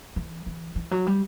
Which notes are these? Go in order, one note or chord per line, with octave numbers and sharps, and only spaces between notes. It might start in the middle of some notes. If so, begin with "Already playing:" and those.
E3
E3
E3
F#3
G3